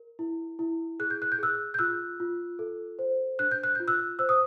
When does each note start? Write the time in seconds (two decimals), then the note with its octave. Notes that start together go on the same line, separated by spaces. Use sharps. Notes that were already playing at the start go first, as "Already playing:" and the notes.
Already playing: A#4
0.19 E4
0.59 E4
1.00 G#4 F#6
1.10 G6
1.22 F#6
1.32 G6
1.39 G#4 E6 F#6
1.74 G6
1.79 F4 E6 F#6
2.20 F4
2.59 A4
2.99 C5
3.39 D4 F#6
3.51 G6
3.64 F#6
3.75 F4 G6
3.88 E6 F#6
4.19 C5 E6 F#6
4.29 D#6